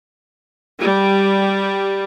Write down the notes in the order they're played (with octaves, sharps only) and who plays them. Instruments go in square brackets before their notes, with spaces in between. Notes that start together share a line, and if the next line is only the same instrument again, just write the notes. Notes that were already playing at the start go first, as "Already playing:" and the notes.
[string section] G3